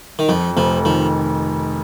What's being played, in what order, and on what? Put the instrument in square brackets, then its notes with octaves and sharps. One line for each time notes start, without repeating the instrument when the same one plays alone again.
[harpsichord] D#3
[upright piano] F2 [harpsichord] F3
[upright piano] F1 [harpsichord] F3
[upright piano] D#3 [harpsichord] F3